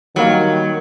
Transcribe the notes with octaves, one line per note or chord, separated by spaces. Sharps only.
D#3 F#3 G3 A#3